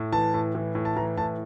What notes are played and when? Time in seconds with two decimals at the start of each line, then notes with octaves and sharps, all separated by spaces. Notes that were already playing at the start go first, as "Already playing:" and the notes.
Already playing: A2
0.12 E3 A5
0.34 A2
0.55 E3
0.75 A2
0.85 A5
0.97 E3 A#5
1.17 A2 A5